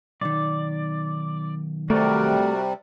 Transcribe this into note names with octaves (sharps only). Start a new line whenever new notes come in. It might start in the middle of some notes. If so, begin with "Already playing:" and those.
B1 D#3 D5
C3 G3 A3 F#4 A#4 D5